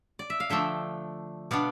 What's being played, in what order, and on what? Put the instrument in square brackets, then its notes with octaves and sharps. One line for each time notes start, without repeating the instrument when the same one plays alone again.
[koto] D5
E5
F5
D3 F3 A3 D4 E5 G5
B2 B3 D4 D5 F5